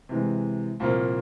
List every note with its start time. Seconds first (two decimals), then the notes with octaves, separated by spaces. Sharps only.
0.09 C3 E3 G#3
0.80 C2 A#2 F3 A#3